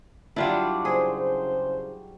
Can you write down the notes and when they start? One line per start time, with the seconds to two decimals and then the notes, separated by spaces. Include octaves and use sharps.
0.36 F#3 G3 D4 E4 F4
0.85 C#3 E4 G#4 C5